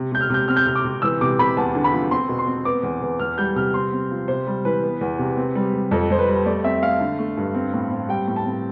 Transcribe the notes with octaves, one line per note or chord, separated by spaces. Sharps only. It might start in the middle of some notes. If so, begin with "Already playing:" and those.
Already playing: C3
C3 G6
F6
C3 G6
C4 F6
G6
C3 F6
D6
C3
E3 E6
C3 D6
C3 B5
E2 A5
D3
B5
F3
C4 C6
B2
C6
C4
B3 D6
E2
E2
E2 F6
G3 G6
C3 F6
C4 C6
C4
F3
C3 C5
G3
E3 B4
B3
E2
C3
C4
G3
G3
F2 A4
F2 C5
B4
G3
A3 D5
C4 E5
A3 F5
D3
A3
G2
C4
A2
C4
G3 G5
A2
A5
C4